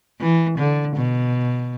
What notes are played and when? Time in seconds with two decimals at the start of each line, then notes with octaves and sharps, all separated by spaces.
0.20 E3
0.58 D3
0.96 B2